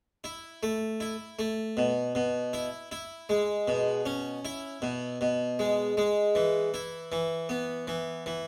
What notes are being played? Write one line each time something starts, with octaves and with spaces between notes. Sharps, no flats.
E4
A3
E4
A3
B2
B2
E4
E4
G#3
B2
C#4
E4
B2
B2
G#3
G#3
E3
E4
E3
B3
E3
E3